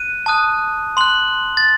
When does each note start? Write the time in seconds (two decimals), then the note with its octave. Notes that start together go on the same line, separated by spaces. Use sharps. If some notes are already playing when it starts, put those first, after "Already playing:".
Already playing: F#6 D#7
0.26 A5 D#6 F#6
0.97 C6 F#6 F#7
1.57 A6